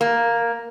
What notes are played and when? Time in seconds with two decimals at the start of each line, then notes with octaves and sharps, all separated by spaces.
0.01 A#3